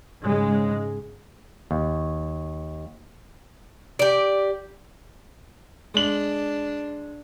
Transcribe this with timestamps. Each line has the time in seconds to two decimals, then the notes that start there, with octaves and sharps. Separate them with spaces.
0.22 G#2 C#3 G#3
1.71 D#2
3.99 G4 D5
5.94 G#3 D4 F#7